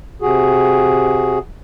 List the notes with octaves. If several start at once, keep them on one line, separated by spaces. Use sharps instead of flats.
C3 F#4 G#4